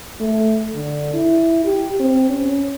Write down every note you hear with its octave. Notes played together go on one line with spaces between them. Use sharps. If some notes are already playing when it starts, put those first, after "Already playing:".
A3
D3
E4
G4
C4
C#4